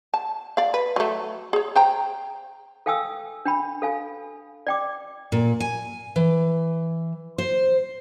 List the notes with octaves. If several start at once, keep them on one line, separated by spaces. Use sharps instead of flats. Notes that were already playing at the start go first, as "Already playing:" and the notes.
A5
D5 F5
B4
F#3 A3
G#4 C#5
C5 G5 A#5
A4 F5 G5 G#5 D#6 E6
D4 G5 B5
A4 F5 G#5
D5 G5 D6
A#2
G#5
E3
C5